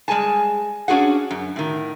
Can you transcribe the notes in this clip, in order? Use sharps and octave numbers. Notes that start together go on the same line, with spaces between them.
G3 G#3 G#4 G#5 A5
C#4 D4 F#4 G#4 F#5
F#2
A2 D#3